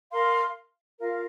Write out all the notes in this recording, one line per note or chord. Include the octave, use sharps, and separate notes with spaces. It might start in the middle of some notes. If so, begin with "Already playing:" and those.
A#4 F5 C6
F4 A#4 F5